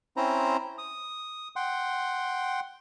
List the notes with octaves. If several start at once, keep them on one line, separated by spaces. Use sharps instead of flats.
C4 C#4 E4 C5 A#5
D#6
F#5 G5 C6